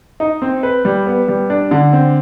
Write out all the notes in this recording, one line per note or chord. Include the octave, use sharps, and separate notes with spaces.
D#4
C4
B4
G3
B3
G3
D4
D3
C4